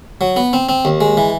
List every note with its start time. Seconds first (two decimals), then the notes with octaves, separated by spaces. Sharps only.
0.21 F#3
0.36 B3
0.53 C4
0.69 C4
0.85 D#2
1.01 G#3
1.17 E3